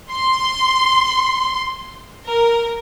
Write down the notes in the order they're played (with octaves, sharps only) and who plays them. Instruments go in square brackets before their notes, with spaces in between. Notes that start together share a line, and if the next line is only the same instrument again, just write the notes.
[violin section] C6
A#4